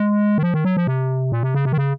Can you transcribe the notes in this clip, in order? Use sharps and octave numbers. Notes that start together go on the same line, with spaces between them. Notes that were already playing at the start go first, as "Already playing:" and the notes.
Already playing: G#3
D#3
F3
D#3
F#3
F3
C3
A#2
C3
C#3
C3
D#3
C#3